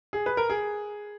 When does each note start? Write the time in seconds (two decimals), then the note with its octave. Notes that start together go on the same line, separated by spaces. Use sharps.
0.13 G#4
0.26 B4
0.37 A#4
0.50 G#4